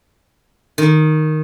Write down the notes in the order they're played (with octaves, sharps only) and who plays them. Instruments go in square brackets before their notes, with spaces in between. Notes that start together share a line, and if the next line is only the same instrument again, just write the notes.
[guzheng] D#3